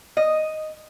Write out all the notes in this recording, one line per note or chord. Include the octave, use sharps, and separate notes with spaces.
D#5